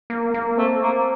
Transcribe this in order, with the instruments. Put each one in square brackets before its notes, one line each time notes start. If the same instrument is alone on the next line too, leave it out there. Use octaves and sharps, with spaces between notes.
[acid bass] A#3
A#3
[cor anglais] A3 [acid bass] C4
[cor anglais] A#3